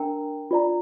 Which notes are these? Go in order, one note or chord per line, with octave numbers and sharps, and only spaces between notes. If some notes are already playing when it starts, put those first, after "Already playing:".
Already playing: D4 A#4 G5 A#5
F4 D5 A#5